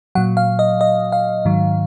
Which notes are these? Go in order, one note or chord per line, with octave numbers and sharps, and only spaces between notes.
A#2 F#3 F#5
F5
D#5
D#5
F5
G#2 D#3 F#3